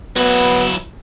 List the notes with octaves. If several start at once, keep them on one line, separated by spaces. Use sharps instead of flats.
F#3 B3 E4